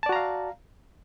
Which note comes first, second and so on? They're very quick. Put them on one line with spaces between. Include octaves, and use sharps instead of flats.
A5 D5 F#4 A#5 F5